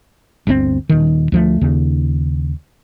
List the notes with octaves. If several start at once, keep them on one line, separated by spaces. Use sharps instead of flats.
G1 D2 D3 C4
D#1 D#3
D2 F3 A3
D#2 C#3